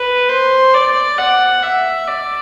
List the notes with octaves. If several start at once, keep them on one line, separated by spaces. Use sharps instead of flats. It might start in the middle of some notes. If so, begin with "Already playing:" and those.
Already playing: B4
C5
D5
F#5
E5
D5